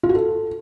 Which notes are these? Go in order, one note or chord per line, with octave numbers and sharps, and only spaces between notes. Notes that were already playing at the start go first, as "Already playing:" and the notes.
F4
F#4
A4